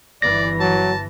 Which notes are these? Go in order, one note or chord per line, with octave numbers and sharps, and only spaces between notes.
G1 E3 D5 A#6
F#3 A5